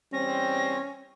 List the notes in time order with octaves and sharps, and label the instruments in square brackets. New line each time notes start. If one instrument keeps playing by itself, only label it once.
[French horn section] E2 G3 C4 [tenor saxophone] C#4 [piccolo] A#6